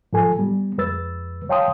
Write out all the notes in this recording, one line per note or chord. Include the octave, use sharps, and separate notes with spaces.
G#2 F3 A4 G#5
G3 B3
F2 G#3 B4 E6 A6
C#5 F5 G5 A5 C6 D#6